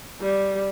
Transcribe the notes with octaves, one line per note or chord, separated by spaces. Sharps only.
G3